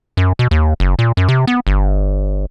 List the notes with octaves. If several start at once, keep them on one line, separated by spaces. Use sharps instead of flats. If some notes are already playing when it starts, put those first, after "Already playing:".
F#2
B2
D#2
F#1
A#2
F#2
C3
B3
G1